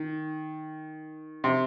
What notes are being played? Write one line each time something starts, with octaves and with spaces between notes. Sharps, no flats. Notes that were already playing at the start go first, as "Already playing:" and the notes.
Already playing: D#3
C3